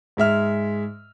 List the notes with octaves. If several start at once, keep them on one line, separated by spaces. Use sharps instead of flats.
G#2 G#3 E5 F6